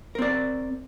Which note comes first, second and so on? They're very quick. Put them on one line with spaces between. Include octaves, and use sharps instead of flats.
A#4 C4 D5